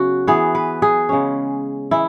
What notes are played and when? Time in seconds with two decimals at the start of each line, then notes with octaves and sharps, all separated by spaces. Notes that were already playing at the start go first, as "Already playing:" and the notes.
Already playing: C#3 F#3 B3 F#4
0.27 E3 B3 G#4
0.55 B4
0.82 G#4
1.09 C#3 G#3 C#4
1.91 E3 G#3 E4